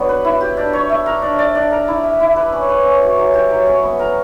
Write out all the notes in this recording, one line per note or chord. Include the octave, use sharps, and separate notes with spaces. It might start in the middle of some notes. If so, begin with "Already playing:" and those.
Already playing: F#3 B3 D4
B4
E4
G4
D4
C#5
E5
A#4
D4
D5
D4
A#4
E4
E5
E4
B4
C#4
B4
C#4
F#4
F#3
G4
F#3
C#4
B3
A#4